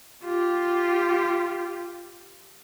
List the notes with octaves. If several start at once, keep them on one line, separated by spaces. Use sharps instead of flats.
F4 G4